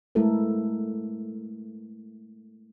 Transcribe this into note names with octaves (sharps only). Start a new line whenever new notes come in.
G#3 A3 B3 E4 A4 A#4